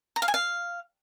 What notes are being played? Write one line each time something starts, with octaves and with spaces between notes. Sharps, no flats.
A#5
F5
G#5
F5